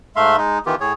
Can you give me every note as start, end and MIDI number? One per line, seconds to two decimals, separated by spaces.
0.16 0.36 44
0.16 0.36 57
0.16 0.36 76
0.16 0.36 77
0.16 0.36 84
0.37 0.58 56
0.37 0.58 63
0.66 0.75 51
0.66 0.75 52
0.66 0.75 59
0.66 0.75 65
0.66 0.75 67
0.81 0.93 45
0.81 0.93 68
0.81 0.93 73